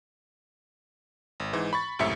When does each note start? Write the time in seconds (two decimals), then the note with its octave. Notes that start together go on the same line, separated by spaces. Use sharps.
1.40 G#1
1.53 G#2 E3
1.73 B5 C#6 A6
1.99 C#2 F#2 A2 C3 E5 C#7